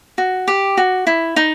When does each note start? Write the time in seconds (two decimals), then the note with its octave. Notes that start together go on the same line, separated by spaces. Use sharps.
0.18 F#4
0.48 G4
0.77 F#4
1.07 E4
1.36 D#4